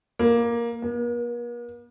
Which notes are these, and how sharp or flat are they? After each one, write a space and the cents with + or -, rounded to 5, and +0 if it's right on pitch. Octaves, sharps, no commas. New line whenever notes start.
A#3 +10
A#3 +45